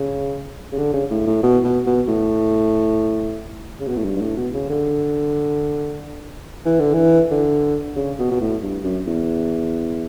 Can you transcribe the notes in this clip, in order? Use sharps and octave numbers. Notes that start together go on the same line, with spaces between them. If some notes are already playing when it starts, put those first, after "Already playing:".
Already playing: C#3
C#3
D3
C#3
A2
A2
B2
B2
B2
A2
C#3
B2
A2
G2
G2
A2
B2
C#3
D3
E3
D3
E3
D3
C#3
B2
B2
A2
G2
F#2
E2